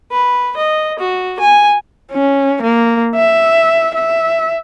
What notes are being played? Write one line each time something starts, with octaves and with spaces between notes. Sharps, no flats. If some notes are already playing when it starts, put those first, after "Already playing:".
B4
D#5
F#4
G#5
C#4
A#3
E5
E5